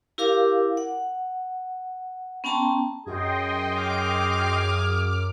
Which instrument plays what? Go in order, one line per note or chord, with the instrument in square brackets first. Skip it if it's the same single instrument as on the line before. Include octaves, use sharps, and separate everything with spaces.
[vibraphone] E4 G4 A#4 F5 D6
F#5
B3 C#4 G5 A5 A#5 C6
[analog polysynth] F#2 [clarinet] G#4 [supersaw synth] D#5 G5 C6
[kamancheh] D6 F6